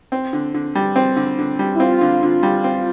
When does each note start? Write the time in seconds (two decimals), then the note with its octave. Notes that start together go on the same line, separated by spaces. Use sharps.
0.12 C4
0.33 D3
0.54 D3
0.75 G3
0.96 C4
1.16 D3
1.39 D3
1.59 G3
1.75 E4
1.80 C4 F4
2.01 D3
2.23 D3
2.43 G3
2.64 C4